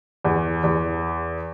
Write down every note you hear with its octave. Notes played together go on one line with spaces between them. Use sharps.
E2
E2